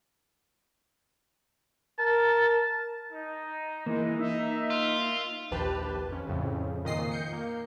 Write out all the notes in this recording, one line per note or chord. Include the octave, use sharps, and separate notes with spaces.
A#4 A5
D#4
E3 G#3 A#3 D#4
D#4 E5
F4
A#1 D#2 G4 B4 A5
F2 C#4
F2 A2 C#3
F2 A#2 D#3 D#5 A#6 C7
G6 C#7
A#3